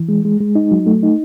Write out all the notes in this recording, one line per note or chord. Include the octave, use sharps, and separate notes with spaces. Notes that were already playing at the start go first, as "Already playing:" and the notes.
Already playing: E3
G#3
G#3
G#3
D#4
F#3
A3
D#4